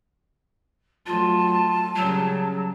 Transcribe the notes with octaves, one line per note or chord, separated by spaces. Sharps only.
F#3 A3 F4 A5
C#3 F#3 G3